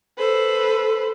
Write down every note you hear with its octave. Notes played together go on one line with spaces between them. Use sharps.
A4 B4 C5